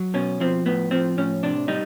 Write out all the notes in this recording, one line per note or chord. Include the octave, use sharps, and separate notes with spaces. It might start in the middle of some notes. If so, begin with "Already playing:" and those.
Already playing: F#3
B2 C#4
F3 C4
A2 B3
F3 C4
A2 C#4
C3 D4
G3 D#4